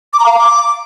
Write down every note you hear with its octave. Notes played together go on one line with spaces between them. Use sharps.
D6
A#5
F5
A#5
D6